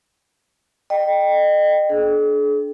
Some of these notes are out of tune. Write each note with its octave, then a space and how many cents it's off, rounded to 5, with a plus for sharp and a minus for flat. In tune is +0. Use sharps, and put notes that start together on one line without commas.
D#5 -35 G5 +0
D4 +0 G#4 +45